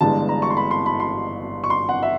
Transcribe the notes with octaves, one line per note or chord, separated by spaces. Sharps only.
G1 G2 E3 G#3 A5
A#5
C#6
C6
B5
C6
B5
C6
C#6
C6
F#5
E5